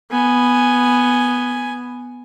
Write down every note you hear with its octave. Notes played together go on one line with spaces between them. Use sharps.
B3 G#5